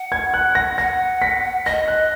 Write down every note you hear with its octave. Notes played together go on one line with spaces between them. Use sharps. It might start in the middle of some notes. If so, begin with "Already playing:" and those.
Already playing: F#5
G#6
F#6
A#6
F#5 A#6
B6
D#5 A#6
F#6